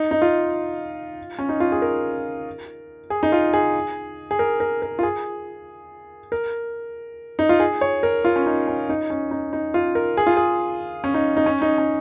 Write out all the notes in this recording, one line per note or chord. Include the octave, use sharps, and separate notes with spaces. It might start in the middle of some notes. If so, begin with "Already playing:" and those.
Already playing: D#4
D#4
F4
C#4
D#4
F4
G#4
A#4
G#4
D#4
F4
G#4
G#4
A#4
A#4
A#4
F4
G#4
A#4
D#4
F4
G#4
C#5
A#4
F4
C#4
D#4
C#4
D#4
C#4
D#4
D#4
F4
A#4
G#4
F4
G#4
C#4
D#4
D#4
C#4
D#4
C#4